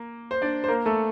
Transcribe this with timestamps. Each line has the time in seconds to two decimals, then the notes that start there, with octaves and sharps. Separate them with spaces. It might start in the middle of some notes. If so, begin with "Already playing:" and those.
Already playing: A#3
0.31 C5
0.42 D4 D5
0.64 C5
0.68 A#3 A#4
0.86 A3 A4